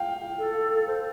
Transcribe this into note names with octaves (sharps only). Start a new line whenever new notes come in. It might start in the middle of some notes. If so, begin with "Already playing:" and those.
Already playing: F5 G5
A4
C5